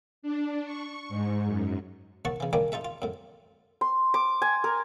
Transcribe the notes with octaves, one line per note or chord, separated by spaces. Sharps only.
D4
C#6
G#2
F#2
D#2 F#5 A5 C#6
C#3 E3
D#3 G3 A#3 C#4 D4
D#4 F4 A4 E5
F4
F#2 A2
C6
D6
G#5
A#4